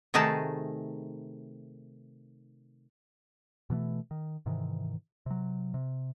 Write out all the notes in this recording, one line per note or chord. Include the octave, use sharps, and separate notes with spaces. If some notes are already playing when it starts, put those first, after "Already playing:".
C3 D#3 A3 D#4 G#4 A5
B2 E3 G#3 A3
D#3
G#2 C3 D#3 E3
C3 F#3
C3